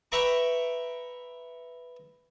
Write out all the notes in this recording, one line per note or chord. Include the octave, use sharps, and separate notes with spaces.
B4 E5 G5 A#5 C#6 D6